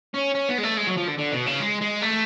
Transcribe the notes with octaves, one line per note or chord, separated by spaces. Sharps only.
C#4
C#4
B3
G#3
A3
G#3
F#3
F3
D3
D3
B2
C#3
G#3
G#3
A3